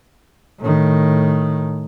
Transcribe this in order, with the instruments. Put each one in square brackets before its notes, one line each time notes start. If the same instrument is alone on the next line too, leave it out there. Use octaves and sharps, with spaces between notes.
[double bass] A2 D#3